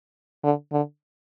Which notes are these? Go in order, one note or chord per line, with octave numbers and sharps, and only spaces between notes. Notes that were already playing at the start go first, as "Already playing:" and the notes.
D3
D3